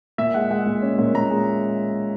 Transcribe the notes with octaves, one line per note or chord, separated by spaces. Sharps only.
A#2 E5
G#3 F#5
G#3 F#5
A#2
C#4
A#2
A#2 A#5
G#3